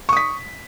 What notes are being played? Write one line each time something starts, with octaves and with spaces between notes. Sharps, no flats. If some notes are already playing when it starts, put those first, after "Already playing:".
C#6 D#6 B6